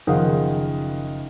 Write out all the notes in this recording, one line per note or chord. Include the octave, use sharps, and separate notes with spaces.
F#1 D#3 F3 G#4 F5 F#5